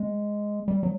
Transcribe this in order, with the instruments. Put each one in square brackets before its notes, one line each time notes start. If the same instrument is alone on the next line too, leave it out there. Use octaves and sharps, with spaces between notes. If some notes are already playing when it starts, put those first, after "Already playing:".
Already playing: [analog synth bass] G#3
G3
F#3